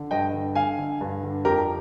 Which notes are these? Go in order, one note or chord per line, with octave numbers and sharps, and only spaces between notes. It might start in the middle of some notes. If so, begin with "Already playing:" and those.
Already playing: D3
G2 D#5 G5
D3
D3 F5 G#5
D3
G2
D3
F2 G4 A#4